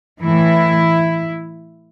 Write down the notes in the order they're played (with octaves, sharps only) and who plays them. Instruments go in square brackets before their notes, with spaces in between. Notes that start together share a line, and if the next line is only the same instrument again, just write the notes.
[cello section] A2 E3 E4